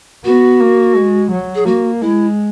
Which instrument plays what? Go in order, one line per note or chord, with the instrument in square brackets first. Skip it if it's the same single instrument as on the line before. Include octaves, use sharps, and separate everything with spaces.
[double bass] B3 [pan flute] F#4
[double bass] A#3
G#3
F#3
[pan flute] G#4
[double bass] A#3 [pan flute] F#4
[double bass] G#3 [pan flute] E4